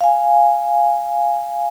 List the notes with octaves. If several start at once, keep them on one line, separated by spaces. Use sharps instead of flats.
F5 G#5